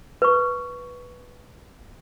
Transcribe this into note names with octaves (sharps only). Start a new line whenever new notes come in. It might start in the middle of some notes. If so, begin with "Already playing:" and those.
B4 C#6